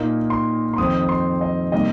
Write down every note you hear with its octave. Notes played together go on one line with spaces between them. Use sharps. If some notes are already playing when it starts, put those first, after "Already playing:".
Already playing: A#2 A#3 D#4
C6
C6
F2 D#3 C4 D#4 D#6
D#6
C6
D#5
C3 G3 A#3 D#4 D#5